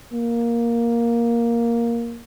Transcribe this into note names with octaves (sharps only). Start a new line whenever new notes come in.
A#3